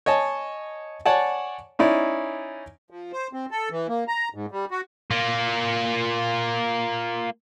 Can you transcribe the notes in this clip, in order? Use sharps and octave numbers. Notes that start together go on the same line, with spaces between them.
C#5 D#5 G#5 A5
C#5 D5 F#5 G#5 A5
C#4 D#4 E4 D5
F3
C5
C4
A4
E3
A#3
A#5
G#2
G3
F#4
A#3 F4